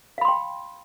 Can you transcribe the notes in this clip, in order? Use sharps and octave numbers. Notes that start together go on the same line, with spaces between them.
F5 G5 B5 C6